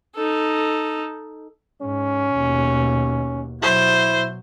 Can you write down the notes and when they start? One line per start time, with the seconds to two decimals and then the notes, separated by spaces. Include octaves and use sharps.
0.15 D#4 A4
1.82 G#2 C#4
2.33 D#2 B2
3.63 B2 F#3 E4 C5